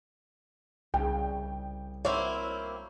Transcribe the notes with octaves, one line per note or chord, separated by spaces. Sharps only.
C2 C#3 G5
A#3 C4 E4 F#4 C5 C#5